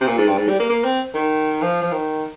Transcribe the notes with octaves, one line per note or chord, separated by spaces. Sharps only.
C3
A#2
G#2
G2
G#2
G3
A#3
A#3
C4
D#3
F3
F3
D#3